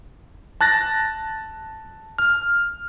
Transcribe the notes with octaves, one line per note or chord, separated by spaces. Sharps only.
A5 F#6 A6 A#6
F6